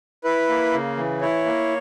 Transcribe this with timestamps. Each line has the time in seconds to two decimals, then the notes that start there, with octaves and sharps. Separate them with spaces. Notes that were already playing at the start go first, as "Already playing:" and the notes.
0.24 E4 B4
0.49 A#3
0.73 C#3
0.97 E3
1.21 E4 C#5
1.45 A#3